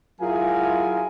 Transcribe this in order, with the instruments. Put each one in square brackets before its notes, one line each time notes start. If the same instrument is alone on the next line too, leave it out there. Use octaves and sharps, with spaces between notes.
[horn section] F#3 E4 F4 G#4 A#4 G#5